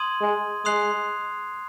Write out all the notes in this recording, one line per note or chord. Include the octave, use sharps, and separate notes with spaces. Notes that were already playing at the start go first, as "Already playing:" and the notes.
Already playing: C6 D#6 G#6 D#7 F#7
G#3
G#3 C6 D#6 F#6 C7 F7